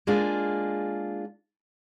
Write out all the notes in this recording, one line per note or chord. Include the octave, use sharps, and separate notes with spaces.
G#3 A#3 D4 F4 G#4